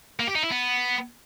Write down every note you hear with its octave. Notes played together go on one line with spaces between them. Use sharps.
A#3
G4
D#4
E4
B3